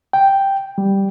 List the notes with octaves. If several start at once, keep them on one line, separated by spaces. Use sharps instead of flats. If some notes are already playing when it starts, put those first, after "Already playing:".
G5
G3